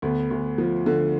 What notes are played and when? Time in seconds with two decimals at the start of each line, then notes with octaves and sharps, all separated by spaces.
0.02 D2 B3
0.30 D2
0.58 F3
0.86 D3